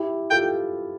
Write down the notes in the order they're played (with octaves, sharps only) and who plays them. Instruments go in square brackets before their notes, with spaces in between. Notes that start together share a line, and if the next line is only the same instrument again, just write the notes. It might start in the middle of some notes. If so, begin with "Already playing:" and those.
Already playing: [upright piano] E4 G4
[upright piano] F4 A4 [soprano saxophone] G5
[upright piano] G4